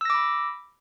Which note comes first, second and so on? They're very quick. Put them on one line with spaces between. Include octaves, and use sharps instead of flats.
E6 A#6 D6 B5